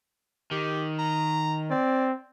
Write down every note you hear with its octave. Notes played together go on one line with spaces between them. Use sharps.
D#3 G4
A#5
C4 D5